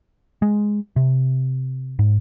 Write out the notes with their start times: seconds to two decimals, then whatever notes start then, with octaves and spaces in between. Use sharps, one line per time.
0.42 G#3
0.96 C3
1.99 G#2